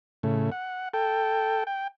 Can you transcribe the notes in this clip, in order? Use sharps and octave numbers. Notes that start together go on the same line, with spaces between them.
A2 C#3 A3
F#5
A4 G5
G5